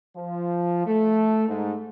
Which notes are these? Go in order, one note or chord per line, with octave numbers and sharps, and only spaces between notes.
F3
A3
G#2